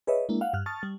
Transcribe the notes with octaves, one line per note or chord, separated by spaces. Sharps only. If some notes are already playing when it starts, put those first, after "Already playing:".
G#4 B4 C#5 D#5 E5
G#3 A#3 D4 E4
F5 F#5
G2 F6 F#6
A5 C#6 D#6 F6 A6
G3